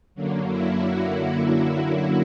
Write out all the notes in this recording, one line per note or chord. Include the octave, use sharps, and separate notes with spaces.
F#2 D3 F#3 A#3
E4
F#4